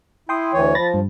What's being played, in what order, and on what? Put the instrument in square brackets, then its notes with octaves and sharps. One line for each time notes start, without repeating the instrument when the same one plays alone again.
[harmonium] E4 [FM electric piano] G5 C6 D#6
[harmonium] D2 E3 C#5
[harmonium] F3 [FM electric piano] B5 A6 A#6
[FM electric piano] G2